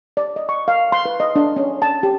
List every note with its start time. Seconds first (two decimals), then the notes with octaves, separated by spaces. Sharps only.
0.17 D5
0.36 D#5
0.49 C#6
0.68 F5
0.92 C6
1.05 B4
1.20 D#5
1.36 D4
1.56 C#4
1.82 A5
2.03 G4